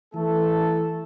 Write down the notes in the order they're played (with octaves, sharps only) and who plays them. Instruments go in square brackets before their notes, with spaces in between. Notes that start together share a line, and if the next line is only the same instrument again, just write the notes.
[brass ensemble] E3 A3 A4